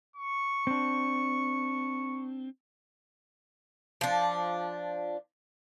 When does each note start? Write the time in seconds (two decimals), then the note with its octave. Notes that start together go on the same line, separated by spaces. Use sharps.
0.16 C#6
0.67 C4 D4
4.01 F3 D4